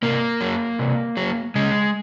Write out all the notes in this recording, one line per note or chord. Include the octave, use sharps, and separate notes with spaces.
C3 A#3
F#3
C3
F#3
C#3 G#3